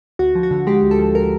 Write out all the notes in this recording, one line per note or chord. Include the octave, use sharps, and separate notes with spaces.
D2 F#4
F3
F#4
D3
G#3 G4
D2
A4
F3
A#4